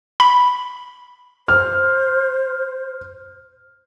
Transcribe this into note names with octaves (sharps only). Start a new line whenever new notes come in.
B5
C5 F6